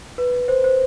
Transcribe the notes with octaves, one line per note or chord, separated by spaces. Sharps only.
B4
C5
C5